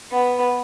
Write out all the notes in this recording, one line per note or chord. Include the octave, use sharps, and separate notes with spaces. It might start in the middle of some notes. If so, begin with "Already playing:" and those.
B3